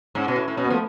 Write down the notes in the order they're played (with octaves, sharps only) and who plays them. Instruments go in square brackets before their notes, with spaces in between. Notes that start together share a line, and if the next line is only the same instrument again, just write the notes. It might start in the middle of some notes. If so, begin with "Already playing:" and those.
[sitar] G#2 [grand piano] C#4
[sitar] B2
A2
A2
[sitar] B2 [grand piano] C#4
[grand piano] B3
[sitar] F3 [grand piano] A3